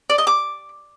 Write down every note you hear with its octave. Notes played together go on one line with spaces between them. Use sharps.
D5
D#5
D6